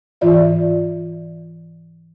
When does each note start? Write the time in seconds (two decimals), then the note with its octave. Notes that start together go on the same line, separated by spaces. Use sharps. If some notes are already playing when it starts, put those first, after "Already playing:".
0.21 G#2 E3 F4 D5 E5